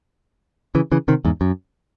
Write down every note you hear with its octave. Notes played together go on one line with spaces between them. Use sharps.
C#3 E3
C#3 E3
C3 D#3
E2 G#2
F#2